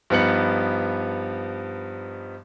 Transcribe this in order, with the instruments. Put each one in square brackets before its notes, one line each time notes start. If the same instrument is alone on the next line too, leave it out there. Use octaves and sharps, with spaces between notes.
[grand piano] G2 F3 B3 D#4 C#7 F#7